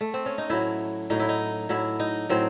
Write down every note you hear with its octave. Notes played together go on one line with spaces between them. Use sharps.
A3
C4
C#4
D#4
A2 F#3 E4
A2 F#3 D#4
E4
D#4
A2 F#3 E4
D#4
A2 F#3 C4